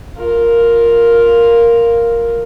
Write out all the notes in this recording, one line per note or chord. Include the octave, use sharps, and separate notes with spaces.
F4 A#4